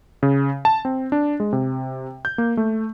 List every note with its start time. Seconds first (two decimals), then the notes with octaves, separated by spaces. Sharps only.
0.23 C#3
0.65 A5
0.85 C4
1.12 D4
1.40 G#3
1.53 C3
2.25 G6
2.38 A#3
2.57 A3